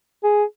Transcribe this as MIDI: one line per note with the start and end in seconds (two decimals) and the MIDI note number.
0.24 0.44 68